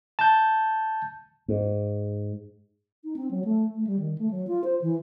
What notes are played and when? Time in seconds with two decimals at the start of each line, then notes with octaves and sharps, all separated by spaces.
0.19 A5 G6
1.48 G#2
3.04 D#4
3.16 C4
3.31 F#3
3.45 A3
3.74 A3
3.87 G3
3.99 D#3
4.18 A3
4.31 F#3
4.47 F4
4.64 C5
4.82 E3